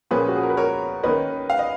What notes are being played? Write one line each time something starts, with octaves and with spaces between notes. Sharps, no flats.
A#2 F3 A#3 C#4 G#4 B4
F#4
G#4
A#4
B4
A#4 C#5
D#3 A#3 C#4 B4 D#5
F5
D#5